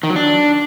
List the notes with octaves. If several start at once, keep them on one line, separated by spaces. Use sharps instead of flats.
D#3
F#3
D4